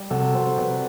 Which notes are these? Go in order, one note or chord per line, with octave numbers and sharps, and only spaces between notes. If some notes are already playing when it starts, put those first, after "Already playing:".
Already playing: G3
C3 F#4 A4
C3 A4 C5
C3 B4 D5